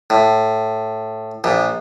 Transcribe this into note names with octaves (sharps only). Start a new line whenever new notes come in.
A2
A#1 A#2